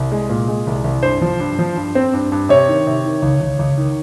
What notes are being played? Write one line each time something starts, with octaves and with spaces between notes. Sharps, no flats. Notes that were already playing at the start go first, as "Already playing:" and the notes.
Already playing: C2
G#3
A#2
G#3
C2
C2
G2 C5
F3
G2
F3
G2
C4
G2
G2
C3 C#5
D#3
C3
D#3
C#2
C#2
C#2
D#3